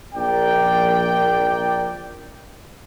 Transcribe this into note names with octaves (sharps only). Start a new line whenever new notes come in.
A#1 A#4 D5 G5